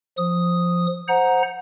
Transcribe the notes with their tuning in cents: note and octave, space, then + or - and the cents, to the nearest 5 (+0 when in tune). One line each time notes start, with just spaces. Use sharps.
F3 +0 D#6 +0
C5 +0 F#5 -10 A#5 +5